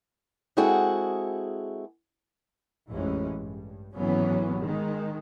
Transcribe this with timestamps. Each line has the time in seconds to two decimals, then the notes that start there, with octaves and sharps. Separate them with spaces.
0.57 G#3 C4 E4 F#4 G#4 A4
2.89 A1 F2 E3 G#3 C#4
3.32 G2
3.94 G#1 A2 E3 F#3 B3 C#4
4.61 D#3 G#3